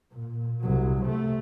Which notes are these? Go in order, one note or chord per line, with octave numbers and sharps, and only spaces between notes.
A#2
C2 F#3
C3 A3